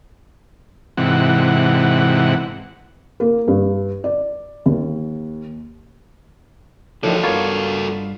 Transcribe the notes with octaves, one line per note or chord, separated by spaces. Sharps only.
G#2 C3 E3 F#5
A#3
G2
D5
D#2
A2 D3 D#3 F3 F#4 A4
G2 A#3 B3 F4 C#5